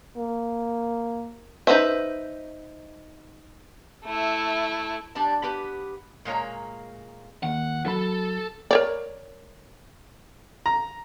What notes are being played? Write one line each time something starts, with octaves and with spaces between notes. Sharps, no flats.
A#3
D#4 G#4 B4 C5 E5
A3 E4
G3 D4 D5 A5
B3 G4 B4
A#2 G#3 A#3 C#5 A#5
D#2 F#5
F#3 A4 B5
A#4 C#5 D5
A#5